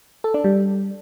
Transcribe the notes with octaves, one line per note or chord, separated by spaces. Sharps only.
A4
D4
G3